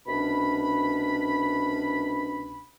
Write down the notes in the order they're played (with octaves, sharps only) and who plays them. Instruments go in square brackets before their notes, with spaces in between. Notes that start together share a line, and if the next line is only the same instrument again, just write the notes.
[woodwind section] C2 B2 C#4 D4 B5